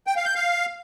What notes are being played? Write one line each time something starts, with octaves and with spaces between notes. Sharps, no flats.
G5
F5
G6
F5